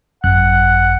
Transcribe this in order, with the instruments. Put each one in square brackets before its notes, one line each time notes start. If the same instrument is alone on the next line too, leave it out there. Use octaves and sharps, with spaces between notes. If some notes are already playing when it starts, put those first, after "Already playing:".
[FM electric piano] G#1 F#2 F#6 [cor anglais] F#5